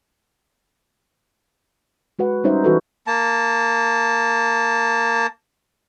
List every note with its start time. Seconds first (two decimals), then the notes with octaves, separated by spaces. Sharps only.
2.19 G#3 F#4 B4 F#5
2.44 G3 C#4 D#4 C5 D#5 E5
2.64 E3 D#4 F#4 A4 B4
3.07 A#3 A5